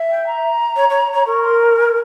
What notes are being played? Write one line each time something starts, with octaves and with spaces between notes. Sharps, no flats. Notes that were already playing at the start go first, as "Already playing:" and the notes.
Already playing: E5
G5
A#5
C#5
C#5
C#5
A#4 C#6
C6
A#5
G#5